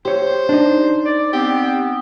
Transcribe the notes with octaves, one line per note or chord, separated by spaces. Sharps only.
G4 C5 C#5
D4 D#4
D5
B3 C4 G4